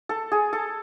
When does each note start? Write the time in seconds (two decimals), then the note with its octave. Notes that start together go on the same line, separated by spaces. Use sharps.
0.09 A4
0.32 G#4
0.53 A4